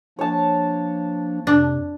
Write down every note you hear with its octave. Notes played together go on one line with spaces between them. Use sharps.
F3 A#3 D4 C#5 A5
F2 C3 D4